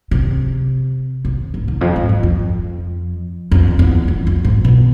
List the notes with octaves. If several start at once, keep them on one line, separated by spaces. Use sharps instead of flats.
C3
C3
G#2
E2
F2
G#2
G#2
F2
F2
E2
F2
F2
G#2
B2